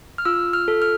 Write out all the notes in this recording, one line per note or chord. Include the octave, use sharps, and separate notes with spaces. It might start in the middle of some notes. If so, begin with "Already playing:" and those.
F6
F4 E6
F6
A4
F6